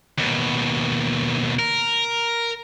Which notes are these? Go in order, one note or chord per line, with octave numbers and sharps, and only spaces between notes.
D#2 B2
A#4